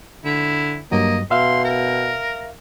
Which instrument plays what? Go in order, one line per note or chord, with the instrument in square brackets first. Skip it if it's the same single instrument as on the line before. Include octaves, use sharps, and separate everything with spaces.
[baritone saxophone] D3 [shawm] E4
[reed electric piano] G2 F#3 [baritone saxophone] A#3 [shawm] D#5
[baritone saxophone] B2 [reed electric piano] E5 F5 [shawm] C6
[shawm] A#4